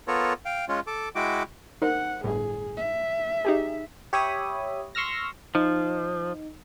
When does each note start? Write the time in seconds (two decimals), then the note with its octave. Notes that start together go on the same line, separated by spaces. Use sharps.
0.08 B3 F4 A4 A#4 C#5
0.45 F5 G5
0.68 G#3 C#4 F4
0.87 A4 D6
1.15 G#3 E4 F#4 G5 D6
1.82 D#4 A#4 C5 F#5
2.24 G1 A2 G#4
2.77 E5
3.45 D#4 G4 G#4
4.13 G4 C#5 E5 B5 D#6
4.95 C6 C#6 E6 F6 A#6
5.55 F3 D#4